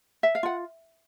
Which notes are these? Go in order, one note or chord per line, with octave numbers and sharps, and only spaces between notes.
E5
F5
F4 F#5